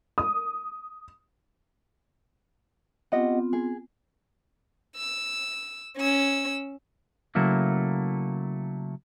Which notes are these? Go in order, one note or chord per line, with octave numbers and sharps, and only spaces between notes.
D#6
B3 C4 F4 G4 D#5 F#5
G#4
E6
C#4 E6
C#3 F#3 A3 A#3 E4